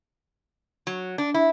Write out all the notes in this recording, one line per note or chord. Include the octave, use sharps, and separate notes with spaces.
F#3
D4
E4